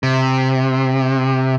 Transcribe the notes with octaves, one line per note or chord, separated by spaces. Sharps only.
C3